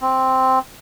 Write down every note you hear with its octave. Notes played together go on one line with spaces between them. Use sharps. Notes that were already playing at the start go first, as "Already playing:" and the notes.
C4